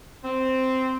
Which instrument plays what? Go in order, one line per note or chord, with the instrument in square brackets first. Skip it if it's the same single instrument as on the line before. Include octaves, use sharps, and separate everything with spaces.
[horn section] C4